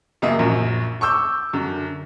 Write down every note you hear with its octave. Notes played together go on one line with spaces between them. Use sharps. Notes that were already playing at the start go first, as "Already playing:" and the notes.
C#2 F#2 A#3 E5 D#6
A#1 F#2
C#6 D6 E6 G6
F#2 D3